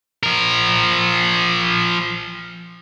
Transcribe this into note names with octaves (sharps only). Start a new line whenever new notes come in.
F3 A#4